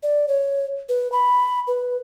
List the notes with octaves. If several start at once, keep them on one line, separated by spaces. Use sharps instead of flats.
D5
C#5
B4
B5
B4